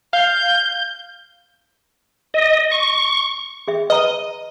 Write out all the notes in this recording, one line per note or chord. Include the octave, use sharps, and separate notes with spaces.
F5 G6
D#5
C#6
G#4 E5
B4 D#5 A#5